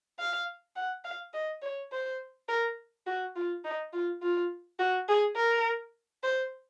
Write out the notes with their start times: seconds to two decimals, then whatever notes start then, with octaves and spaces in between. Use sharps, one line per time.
0.19 F5
0.76 F#5
1.04 F5
1.34 D#5
1.62 C#5
1.92 C5
2.49 A#4
3.07 F#4
3.35 F4
3.65 D#4
3.93 F4
4.22 F4
4.79 F#4
5.08 G#4
5.36 A#4
6.23 C5